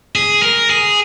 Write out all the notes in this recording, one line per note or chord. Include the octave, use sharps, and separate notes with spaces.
G#4
A#4
G#4